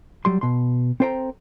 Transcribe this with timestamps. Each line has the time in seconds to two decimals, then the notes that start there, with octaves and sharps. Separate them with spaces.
0.25 F#3 G3 C6
0.41 B2 C6
1.00 C4 A4 C5 G5 A#5